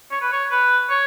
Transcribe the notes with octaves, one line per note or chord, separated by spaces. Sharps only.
C#5
B4
C#5
B4
C#5